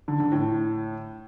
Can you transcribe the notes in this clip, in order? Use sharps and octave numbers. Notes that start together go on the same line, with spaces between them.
D3
D3
A2